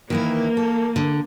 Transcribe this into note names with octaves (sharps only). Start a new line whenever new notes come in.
D#3 E3 A#3 E4
A4
D3